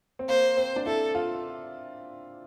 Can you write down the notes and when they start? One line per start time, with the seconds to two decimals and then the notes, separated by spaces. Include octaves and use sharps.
0.19 C4
0.28 A#3 C5
0.57 C4
0.76 D4
0.86 E4 A4
1.15 F4